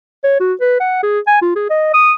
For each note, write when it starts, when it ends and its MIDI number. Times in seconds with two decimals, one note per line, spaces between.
0.24 0.39 73
0.40 0.53 66
0.60 0.78 71
0.80 0.99 78
1.03 1.19 68
1.27 1.37 80
1.42 1.52 65
1.56 1.68 68
1.70 1.90 75
1.94 2.13 87